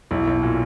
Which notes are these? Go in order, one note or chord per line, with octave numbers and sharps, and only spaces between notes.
B1 E4
B1
A#2